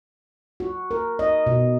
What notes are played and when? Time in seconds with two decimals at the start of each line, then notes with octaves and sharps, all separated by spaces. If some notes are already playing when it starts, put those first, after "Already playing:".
0.60 F#4
0.91 A#4
1.19 D#5
1.47 B2